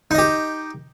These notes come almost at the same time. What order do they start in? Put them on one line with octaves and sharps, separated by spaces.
D#4 D#5 G4